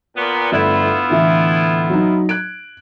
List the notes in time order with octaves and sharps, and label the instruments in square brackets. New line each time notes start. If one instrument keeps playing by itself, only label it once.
[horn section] A#2 B3
[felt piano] G1 A3 D5 [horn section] B3 E4 F4
[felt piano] A2 D3 E3
F#3 D#4
F#6 G#6 D7